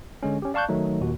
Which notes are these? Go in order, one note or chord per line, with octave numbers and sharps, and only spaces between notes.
D3 G#3 C#4
C#4 G4
D5 F5 A5 C#6 F#6 G6
D#3 F#3 A3 D#4
D#2 A#2 F#4